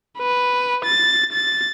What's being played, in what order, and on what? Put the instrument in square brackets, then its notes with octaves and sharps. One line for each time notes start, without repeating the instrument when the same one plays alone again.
[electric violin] B4
A6
A6